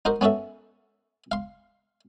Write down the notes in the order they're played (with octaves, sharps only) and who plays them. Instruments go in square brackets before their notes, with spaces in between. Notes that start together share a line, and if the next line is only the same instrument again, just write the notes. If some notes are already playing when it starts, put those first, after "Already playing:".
[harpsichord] D#4 F#4 A#4 C5
B3 C#4 F#4 A4 E5
F5 C6